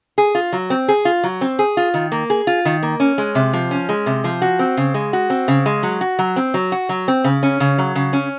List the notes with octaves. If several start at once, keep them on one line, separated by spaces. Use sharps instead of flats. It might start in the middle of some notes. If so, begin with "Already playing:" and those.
G#4
F4
F#3
C4
G#4
F4
F#3
C4
G#4
F4
D#3
A#3
G#4
F4
D#3
A#3
C#4
G#3
C3
F3
C#4
G#3
C3
F3
F#4
C4
C#3
G#3
F#4
C4
C#3
G#3
F#3
F#4
F#3
C4
F#3
F#4
F#3
C4
C#3
C#4
C#3
F#3
C#3
C#4